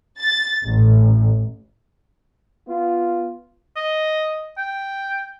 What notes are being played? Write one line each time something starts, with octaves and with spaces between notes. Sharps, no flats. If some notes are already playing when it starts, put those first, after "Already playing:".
A6
A1
B3 F4
D#5
G5